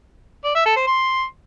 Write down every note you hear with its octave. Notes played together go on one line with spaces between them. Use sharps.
D5
E5
A4
C5
C6